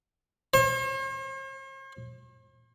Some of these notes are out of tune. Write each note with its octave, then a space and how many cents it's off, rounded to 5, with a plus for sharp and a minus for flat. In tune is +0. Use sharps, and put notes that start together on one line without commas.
C5 +45